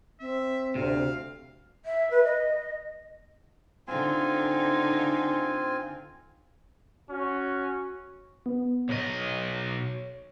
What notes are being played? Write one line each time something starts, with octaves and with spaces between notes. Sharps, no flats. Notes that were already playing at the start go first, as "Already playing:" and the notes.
C4 E5
D2 C3 F5
E5
B4
D#5
D3 C4 D#4 F4 G#5
C#4 F#4
B3
B1 C#5 D#5